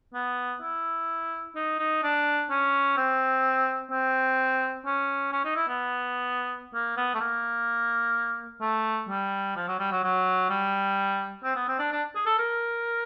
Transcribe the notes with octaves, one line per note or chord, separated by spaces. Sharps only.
B3
E4
D#4
D#4
D4
C#4
C4
C4
C#4
C#4
D#4
E4
B3
A#3
B3
A3
A#3
A3
G3
F3
F#3
G3
F#3
F#3
G3
C4
B3
C4
D4
D4
G#4
A4
A#4